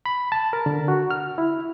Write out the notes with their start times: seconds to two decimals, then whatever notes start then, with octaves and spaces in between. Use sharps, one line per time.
0.06 B5
0.32 A5
0.53 A#4
0.66 D3
0.88 F#4
1.11 F6
1.38 E4